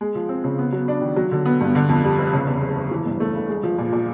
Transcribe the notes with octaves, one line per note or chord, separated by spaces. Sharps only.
G#3
F3
C4
C#3
B3
F#3
D4
D#3
F#3
D3
B3
G2
D3
F2
G3
F1
C#3
E2
F#1
F#1
E3
G2
A3
G1
G#3
F3
A#2
A#2